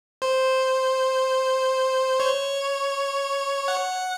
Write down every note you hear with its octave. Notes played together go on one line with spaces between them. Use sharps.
C5
C#5
F#5